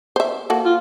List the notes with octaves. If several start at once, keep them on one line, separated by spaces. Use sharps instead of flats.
C5 E5
A#3 F#4 A4
F4